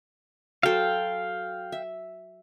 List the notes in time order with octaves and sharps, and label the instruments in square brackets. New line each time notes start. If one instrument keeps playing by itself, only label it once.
[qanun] F#3 A4 C5 [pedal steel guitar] F5 G5
[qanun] E5